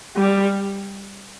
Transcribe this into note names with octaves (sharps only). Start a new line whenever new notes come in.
G3